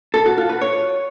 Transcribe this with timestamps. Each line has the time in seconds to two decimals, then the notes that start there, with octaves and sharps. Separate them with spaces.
0.14 A4
0.26 F#4
0.38 F4
0.50 B4
0.61 C#5